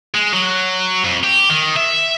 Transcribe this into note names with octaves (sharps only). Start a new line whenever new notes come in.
G#3
F#3
F2
G4
D#3
E5